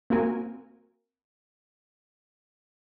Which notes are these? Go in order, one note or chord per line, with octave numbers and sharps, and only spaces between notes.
A#3 C4 F#4 A#4 G#5